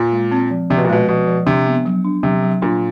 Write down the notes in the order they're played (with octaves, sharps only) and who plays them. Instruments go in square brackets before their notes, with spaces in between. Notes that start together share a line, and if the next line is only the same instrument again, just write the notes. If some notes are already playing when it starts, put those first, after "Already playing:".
Already playing: [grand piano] A#2
[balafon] G#3
C4
F3
[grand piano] C3 [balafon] F3
[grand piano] B2
A#2
[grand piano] B2 [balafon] G#3
[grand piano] B2 [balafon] F3
[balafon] F3
[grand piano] C3 [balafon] D4
[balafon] B3
F#3
D4
[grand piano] C3 [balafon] F#3
[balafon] F#3
[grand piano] A#2 [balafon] D4